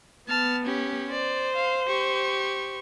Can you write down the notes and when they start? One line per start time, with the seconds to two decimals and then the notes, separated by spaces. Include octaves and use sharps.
0.29 B3 A5 F6
0.65 C#4 G4
1.11 C5 D5
1.56 F5
1.88 G4 C#6